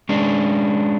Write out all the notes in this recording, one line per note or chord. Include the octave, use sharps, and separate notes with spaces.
G#3 C#4 D4